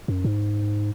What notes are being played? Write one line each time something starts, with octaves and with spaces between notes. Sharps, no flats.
F#2
G#2